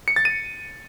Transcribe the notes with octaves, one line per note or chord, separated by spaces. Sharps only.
C#7
A6
D#7